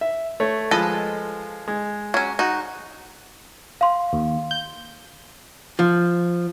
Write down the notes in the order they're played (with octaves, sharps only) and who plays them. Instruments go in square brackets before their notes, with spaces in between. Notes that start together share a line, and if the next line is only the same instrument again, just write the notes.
[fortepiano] E5
A3 C#5
[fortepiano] F3 G#3 [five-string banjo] A4 B4 D#5
[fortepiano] G#3
[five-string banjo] F#3 C#4
D#4 F#4
[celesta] F5 C6
[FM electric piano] D#2
G6
[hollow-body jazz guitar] F3